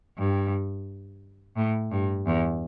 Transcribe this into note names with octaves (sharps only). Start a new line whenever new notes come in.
G2
A2
G2
E2